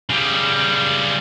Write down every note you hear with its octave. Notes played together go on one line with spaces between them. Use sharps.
C#3 G3